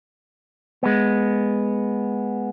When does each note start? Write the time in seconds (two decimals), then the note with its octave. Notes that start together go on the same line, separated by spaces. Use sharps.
0.83 G#3 B3